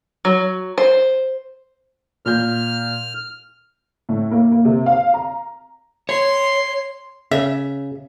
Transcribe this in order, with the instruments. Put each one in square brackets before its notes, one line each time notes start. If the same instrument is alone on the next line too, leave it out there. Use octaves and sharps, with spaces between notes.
[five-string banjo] F#3
C5
[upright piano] A#2 G6 [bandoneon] F6
[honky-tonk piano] A2
A#3
A#3
C3
F5
A#5
[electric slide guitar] C#5 [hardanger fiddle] C6
[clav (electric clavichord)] C#3 [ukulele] E5